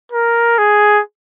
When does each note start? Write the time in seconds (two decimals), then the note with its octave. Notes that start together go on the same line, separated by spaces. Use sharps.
0.12 A#4
0.58 G#4